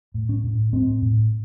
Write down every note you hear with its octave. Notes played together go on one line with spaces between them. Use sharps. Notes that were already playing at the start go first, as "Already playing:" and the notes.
A2
C#4
A2
A2 C4
A2